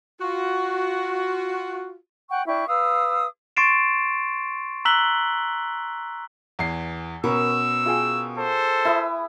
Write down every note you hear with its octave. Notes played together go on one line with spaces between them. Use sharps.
F4 F#4
F#5 G5 C#6
D4 E4 G5 C#6
B4 F5 D#6 E6
C6 C#6 A6 C7 D7 E7
A#5 E6 F#6 B6 F#7 G7
E2 E3 C7
B2 C#4 A#4 B4 E6
F4 G#4 G5
A4 C5
E4 B4 E5 D#6